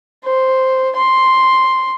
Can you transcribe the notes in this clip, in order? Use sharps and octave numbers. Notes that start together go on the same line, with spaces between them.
C5
C6